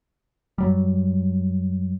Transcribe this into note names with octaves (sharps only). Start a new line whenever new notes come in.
F#2 F#3 G3